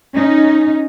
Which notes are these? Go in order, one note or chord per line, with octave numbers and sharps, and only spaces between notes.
C#4 D#4